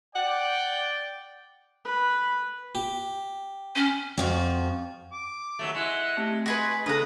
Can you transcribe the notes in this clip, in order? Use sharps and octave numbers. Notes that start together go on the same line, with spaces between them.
D5 F#5 G5
B4
G4
C#4
F2 F3 F#4
D6
D#2 F#3 A3
G#3 E4 F#5
A3 C4 G4
G#3 F#4 G#4 B4 B5
E2 C#3 D4 G#4 A4 B4 A#5 D#6